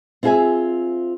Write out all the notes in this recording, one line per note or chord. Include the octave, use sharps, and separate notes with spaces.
C4 E4 F4 G#4 E5 G#5